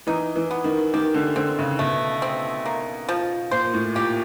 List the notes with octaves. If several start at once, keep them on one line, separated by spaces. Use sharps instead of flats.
E3 D#4
E3
B3
D#3
D#3 G4
D3
D3 C4
C#3
B2 A3
C4
A#3
F3
A#2 C5
A2
A#2 G4